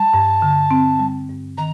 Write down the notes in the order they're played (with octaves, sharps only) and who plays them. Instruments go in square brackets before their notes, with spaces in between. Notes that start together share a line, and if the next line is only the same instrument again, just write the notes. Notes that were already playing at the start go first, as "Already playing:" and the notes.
Already playing: [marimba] G3 [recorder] A5
[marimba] G2
D3
C4
G3
G2
[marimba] D#3 [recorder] A#5